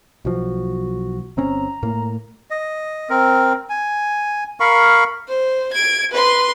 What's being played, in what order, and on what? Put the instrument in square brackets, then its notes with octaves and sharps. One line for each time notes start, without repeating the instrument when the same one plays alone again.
[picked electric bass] B1 F3 [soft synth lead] F#4
[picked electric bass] G1 C4 C#4 [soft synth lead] A#5
[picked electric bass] A2 A#3
[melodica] D#5
C4 A#4
G#5
A#4 F5 B5 C#6
[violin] C5
G#6 D7
B4 C6